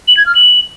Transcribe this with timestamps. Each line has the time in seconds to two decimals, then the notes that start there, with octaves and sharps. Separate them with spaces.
0.08 F#7
0.17 G#6
0.26 F6
0.35 F#7